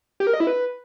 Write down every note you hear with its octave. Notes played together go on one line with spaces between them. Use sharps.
G4
A#4
D#5
E4
B4